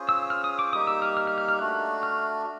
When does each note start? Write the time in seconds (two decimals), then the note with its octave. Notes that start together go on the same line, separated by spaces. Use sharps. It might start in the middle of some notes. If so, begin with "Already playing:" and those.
Already playing: C#4 F4 G#4 C5
0.09 E6
0.30 F6
0.44 D#6
0.59 D6
0.73 G3 A#3 D#4 G4 D#6
0.87 E6
1.02 F6
1.17 F6
1.27 F6
1.38 F6
1.49 F6
1.59 A3 D4 F#4 F#6
2.03 F6